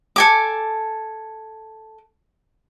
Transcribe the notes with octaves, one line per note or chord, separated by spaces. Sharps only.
A4 G#5 D6